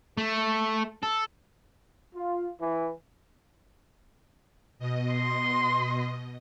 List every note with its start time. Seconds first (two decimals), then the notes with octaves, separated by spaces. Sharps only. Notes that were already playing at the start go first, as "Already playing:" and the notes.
0.17 A3
1.03 A4
2.15 F4
2.60 E3
4.79 B2 D#5
5.12 C6